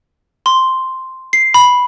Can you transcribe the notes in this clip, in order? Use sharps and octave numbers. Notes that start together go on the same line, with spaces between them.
C6
C7
B5